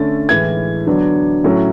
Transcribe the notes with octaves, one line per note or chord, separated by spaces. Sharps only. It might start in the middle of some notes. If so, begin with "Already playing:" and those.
Already playing: D3 A3 C#4 A6
A2 E3 G#3 G#6
D3 F#3 B3 D4
A2 F#3 A3 C#4